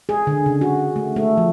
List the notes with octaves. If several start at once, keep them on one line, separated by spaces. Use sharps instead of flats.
G#4
D3
C#3
F#4
A3
A3
F3